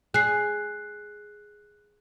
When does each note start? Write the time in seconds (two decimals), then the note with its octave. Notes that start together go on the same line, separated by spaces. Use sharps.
0.14 G#4 F#6 C7